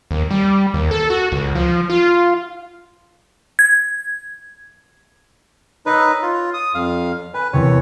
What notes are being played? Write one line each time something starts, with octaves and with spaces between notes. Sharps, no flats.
D#2
G3
D#2
A4
F#4
C#2
F3
F4
G#6
D#4 B4 C#5 E6
F4
D#6
F2 F5
B4 G#5
E2 C3 C#5